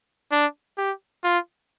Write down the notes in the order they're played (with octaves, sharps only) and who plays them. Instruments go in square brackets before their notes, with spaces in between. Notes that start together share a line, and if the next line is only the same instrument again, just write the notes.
[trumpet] D4
G4
F4